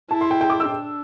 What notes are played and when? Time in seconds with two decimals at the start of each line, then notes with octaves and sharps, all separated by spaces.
0.11 E4 A5
0.21 C6
0.31 G5
0.41 G5
0.50 D6
0.60 E6
0.70 D4